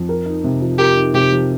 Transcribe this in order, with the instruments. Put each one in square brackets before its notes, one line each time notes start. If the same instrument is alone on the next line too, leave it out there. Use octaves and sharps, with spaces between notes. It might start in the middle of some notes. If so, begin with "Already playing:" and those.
Already playing: [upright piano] F2
A#4
D#4
C3
F3
[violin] G4 [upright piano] A#4
[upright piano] D#4
[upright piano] C3 [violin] G4
[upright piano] F3